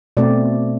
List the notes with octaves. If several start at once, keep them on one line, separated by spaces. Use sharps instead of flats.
B2 A3 C4 D5